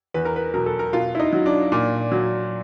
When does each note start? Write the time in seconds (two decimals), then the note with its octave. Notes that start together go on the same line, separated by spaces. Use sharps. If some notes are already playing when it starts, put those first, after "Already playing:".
0.14 E2 B4
0.25 A#4
0.36 B4
0.54 B2 F#3 A#4
0.66 A4
0.79 A#4
0.93 B2 F4
1.15 E4
1.19 D#4
1.33 F#3
1.46 D4
1.72 A#2
2.12 F#3